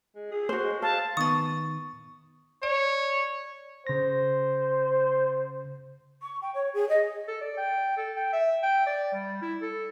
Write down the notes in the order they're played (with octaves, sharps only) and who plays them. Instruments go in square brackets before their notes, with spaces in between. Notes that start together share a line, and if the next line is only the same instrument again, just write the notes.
[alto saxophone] G#3
G#4
[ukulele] F#4 C5
[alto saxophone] G#3
[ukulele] C5 [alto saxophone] F5 [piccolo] A5
[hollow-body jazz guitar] D#3 B3 B4 [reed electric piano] C#6 [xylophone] D#6 A6
[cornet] C#5 [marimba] D5
[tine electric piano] C#3 A#6 [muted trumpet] C5
[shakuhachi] C#6
G5
C#5
G#4
D#5
[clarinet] A4
D5
G5
A4
G5
E5
G5
D5
G3
E4
A4